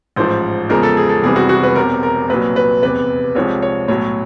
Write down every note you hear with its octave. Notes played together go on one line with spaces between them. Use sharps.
A1 G#2 F3 C5
E2 C#3 F3 G#3 A#4
A4
G#4
A4
F1 E2 C3 E3 G3 G#4
F#4
F#4
B4
E1 E2 C3 A#4
A#4
C2 A#2 F#3 B4
B4
F1 E2 C3 B4
C2 C3 F3 G#3 C#5
C#5
B1 A2 F#3 C#5